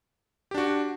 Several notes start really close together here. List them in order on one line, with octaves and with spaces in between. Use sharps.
G4 D4 F#4